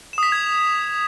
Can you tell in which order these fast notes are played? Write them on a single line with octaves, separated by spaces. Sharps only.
E7 D#6 B6 F7 G#6